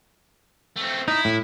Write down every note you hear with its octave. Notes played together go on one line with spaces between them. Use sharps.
A3 C4
D#4 E4
A2